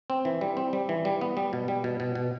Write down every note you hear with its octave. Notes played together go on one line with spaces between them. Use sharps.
C4
E3
G3
C4
G3
E3
G3
B3
G3
B2
G3
B2
B2
B2